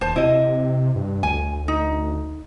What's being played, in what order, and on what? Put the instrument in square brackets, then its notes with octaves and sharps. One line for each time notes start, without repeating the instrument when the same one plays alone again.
[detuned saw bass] D#1 [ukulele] C5 A5
[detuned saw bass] C3 [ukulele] E4 D#5
[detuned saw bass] G2
[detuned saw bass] D2 [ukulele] G#5
[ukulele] D#4